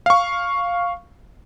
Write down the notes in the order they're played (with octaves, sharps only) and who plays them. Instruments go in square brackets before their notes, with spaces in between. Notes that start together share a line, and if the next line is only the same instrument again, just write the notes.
[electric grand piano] F5 C#6